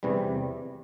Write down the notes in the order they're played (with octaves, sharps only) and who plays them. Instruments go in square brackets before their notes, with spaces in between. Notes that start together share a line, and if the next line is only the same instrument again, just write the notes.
[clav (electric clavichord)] E2 C3 E3 G3